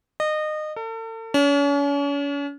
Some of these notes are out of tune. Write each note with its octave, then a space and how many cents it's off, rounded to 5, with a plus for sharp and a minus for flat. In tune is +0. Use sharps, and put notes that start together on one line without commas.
D#5 -25
A4 +40
C#4 +40